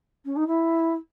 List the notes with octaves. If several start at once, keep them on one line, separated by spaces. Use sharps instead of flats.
C#4
D#4
E4